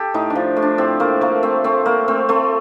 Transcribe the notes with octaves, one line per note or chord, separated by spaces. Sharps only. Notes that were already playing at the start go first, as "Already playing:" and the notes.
Already playing: G4 A4
A2 D#4
D4
F3
A2
D4
A2 C4
A3 A#3
A3 A#3
A3 C4
A3 C4
A3 A#3
A3 C4
A3 C4